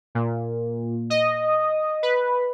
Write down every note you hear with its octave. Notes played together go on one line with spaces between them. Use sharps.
A#2
D#5
B4